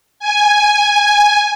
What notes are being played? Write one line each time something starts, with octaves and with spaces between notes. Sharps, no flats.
G#5